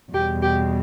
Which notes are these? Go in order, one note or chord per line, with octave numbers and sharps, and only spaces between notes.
E2 B2 G3 G4
G4